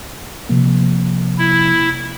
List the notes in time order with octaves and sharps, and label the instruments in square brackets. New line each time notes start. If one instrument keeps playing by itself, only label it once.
[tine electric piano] C3 F3 A#3
[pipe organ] E4